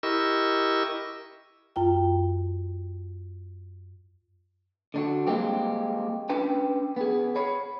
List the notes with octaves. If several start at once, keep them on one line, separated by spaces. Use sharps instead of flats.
E4 G4 A#4 D#5 C#6 E6
F#2 F4 G5
D3 D4 F#4
G3 G#3 A#3 C4 G4
C#4 D4 B4 G5
B3 G#4
C#5 B5